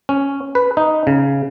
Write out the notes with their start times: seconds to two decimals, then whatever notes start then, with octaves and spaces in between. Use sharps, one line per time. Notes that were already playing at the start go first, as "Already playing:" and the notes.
0.09 C#4
0.55 B4
0.77 D#4
1.07 C#3